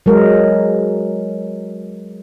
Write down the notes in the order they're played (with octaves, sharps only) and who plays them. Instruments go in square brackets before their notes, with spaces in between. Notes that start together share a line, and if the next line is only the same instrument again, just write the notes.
[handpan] F#3 G#3 A#4